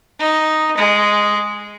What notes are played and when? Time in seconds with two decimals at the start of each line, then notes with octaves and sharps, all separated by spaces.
0.19 D#4
0.77 G#3